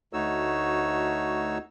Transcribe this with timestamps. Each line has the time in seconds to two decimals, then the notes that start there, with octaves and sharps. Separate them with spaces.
0.13 D2 A3 D#4 F#4 C#5 E6